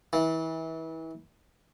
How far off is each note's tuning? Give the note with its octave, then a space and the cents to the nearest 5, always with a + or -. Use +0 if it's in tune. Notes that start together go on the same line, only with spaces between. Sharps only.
E3 -30